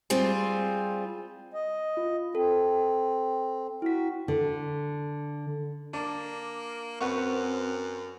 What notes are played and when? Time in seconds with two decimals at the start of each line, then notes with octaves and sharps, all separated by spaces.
0.10 G3 C4 F4 G#4
1.54 D#5
1.97 F4
2.35 C4 A4
3.82 E4 F#4 B6
4.28 D3
5.93 A#3 D4
7.00 F#2 C4 B4 F#5 C#6